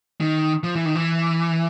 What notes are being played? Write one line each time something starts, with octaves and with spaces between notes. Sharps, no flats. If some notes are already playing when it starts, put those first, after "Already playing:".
D#3
F3
E3
D#3
E3